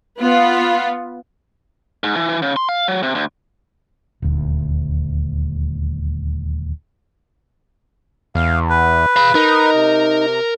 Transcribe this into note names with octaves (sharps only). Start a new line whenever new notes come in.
B3 F4
G#2
E3
E3
C#3
C6
F5
F#3
C3
D2
D#1 D2
E2 F5
B4
F5 B5
D#4 A#4
C3